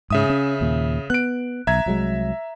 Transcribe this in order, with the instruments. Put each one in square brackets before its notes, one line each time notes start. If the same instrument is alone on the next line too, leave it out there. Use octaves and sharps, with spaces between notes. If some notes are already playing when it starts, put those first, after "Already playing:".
[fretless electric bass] G#2 [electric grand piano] C#3 E5 D#6
[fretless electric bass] C#4
D#2 A#2
[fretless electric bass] B3 [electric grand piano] F#6 D7
[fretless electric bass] B1 [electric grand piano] E5 A#5 G#6
[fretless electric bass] C2 F#3 G#3